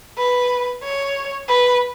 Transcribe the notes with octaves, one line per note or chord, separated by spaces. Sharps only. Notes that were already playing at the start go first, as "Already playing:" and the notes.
B4
C#5
B4